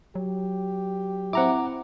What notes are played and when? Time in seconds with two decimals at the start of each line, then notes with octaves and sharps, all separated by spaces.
0.15 F#3 G4
1.33 C4 E4 F#5 A#5 D6